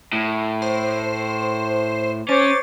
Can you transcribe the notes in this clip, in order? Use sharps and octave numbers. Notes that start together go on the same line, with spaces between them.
A2
C5
C#4 C5 C#5 D6 A6